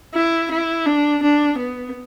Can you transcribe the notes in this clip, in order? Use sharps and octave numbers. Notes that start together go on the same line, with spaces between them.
E4
E4
D4
D4
B3